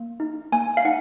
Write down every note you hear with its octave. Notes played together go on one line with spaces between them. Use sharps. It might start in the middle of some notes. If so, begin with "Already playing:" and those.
Already playing: A#3
D#4
A#3 G#5
F5
D#4 F#5